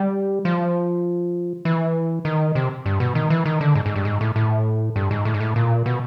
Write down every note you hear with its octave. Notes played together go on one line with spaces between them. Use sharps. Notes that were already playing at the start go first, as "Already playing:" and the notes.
Already playing: G3
F3
E3
D#3
C3
G2
B2
D#3
E3
D#3
D3
G#2
G#2
G2
G#2
A2
A2
G2
G#2
A2
G#2
A2
A#2
B2